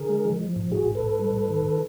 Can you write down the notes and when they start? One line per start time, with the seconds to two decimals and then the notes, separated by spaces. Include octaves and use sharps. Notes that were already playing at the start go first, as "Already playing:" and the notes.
Already playing: D3 G#4 A#4
0.09 G#3
0.25 F3
0.41 F3
0.56 G#2
0.72 G#2 F#4 G#4
0.87 G#2
0.95 A4 B4
1.04 G#2
1.19 G3
1.34 G#2
1.50 D#3